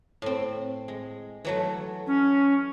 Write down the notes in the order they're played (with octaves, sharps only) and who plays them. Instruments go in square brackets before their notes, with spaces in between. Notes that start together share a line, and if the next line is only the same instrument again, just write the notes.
[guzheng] A2 C4
G#3
E3 F#3 A3
[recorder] C#4